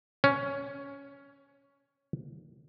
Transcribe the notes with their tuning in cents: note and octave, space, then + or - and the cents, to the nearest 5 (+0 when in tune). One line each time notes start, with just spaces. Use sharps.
C#4 +10